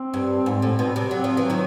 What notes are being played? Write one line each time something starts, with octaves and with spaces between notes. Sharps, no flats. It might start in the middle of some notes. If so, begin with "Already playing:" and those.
Already playing: C4
G2
G#2
A2
B2
C3
F#3 C4
F3
E3
F#3
D#3 F3